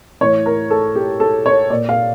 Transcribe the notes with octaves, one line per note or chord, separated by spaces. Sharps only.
A2 E3 C#5
A#4
A4
G4
A4
C#5
A#2 D5
F5